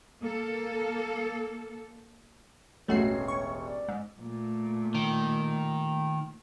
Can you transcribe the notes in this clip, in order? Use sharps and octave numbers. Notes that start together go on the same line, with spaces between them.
A#3 A4
E1 A1 A3 F#4 C#5 C7
C#6
D5
G#2
A#2 A3
D#3